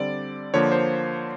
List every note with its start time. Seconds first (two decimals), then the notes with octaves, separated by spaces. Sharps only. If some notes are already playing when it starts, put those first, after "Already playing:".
Already playing: D3 G3 C4 D5
0.54 D3 F3 A#3 C#5
0.72 C5